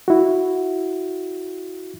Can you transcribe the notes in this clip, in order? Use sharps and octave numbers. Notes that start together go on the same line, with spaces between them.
E4 F#4